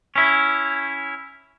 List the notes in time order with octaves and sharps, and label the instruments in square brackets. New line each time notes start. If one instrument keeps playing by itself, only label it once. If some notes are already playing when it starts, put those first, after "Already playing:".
[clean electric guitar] C#4 E4